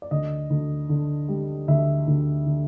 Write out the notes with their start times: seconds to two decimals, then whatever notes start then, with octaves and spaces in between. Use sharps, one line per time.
0.02 D5
0.11 D2 D#5
0.50 D2
0.89 D3
1.29 G3
1.68 D2 E5
2.07 D2
2.46 D3